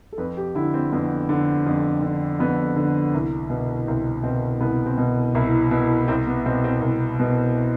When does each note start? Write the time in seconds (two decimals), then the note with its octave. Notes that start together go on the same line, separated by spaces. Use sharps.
0.13 A4
0.18 F2 B4
0.37 G4
0.55 D3 E4
0.74 C4
0.92 F2 B3
1.29 D3
1.66 F2
2.02 D3
2.39 F2 B3
2.76 D3
3.14 C2
3.50 B2
3.87 C2 C4
4.23 B2 C4
4.61 C2 B3
4.86 C4
4.98 B2
5.35 C2 E4
5.71 B2 E4
6.08 C2 C4
6.27 B3
6.46 B2 C4
6.64 C4
6.81 C2
7.20 B2